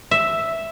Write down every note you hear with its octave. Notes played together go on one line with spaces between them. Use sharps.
E5